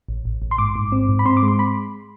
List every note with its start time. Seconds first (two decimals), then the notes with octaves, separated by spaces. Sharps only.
0.08 A1
0.25 A1
0.42 A1
0.51 C6
0.58 G#2 D6
0.76 G#2
0.92 C4
1.09 G#2
1.19 B5
1.25 C4 C6
1.37 D6
1.43 G#3
1.48 C6
1.59 B5